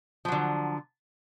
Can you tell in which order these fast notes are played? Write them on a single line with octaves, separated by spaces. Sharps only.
F3 F#3 D3